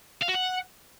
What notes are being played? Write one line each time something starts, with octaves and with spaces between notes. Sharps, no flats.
F5
F#4
F#5